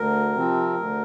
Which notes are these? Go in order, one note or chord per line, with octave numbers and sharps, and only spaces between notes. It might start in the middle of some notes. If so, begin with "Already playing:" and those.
Already playing: D2 A#4
C3 F3 C4
D2